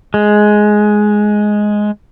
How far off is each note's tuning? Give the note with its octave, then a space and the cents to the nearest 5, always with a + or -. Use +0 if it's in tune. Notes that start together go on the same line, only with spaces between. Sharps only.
G#3 +10